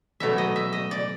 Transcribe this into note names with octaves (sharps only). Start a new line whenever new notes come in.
B2 F#3 A3 E5
D#5
E5
D#5
D5